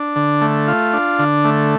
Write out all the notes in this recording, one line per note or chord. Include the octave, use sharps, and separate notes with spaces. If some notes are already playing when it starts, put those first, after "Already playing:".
Already playing: D4
D3
A3
F4
D4
D3
A3